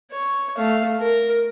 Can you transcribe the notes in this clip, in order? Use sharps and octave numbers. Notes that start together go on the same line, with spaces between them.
C#5
A3 F5
A#4